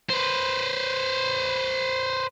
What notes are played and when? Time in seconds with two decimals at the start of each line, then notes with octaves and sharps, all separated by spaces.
0.10 B4 C5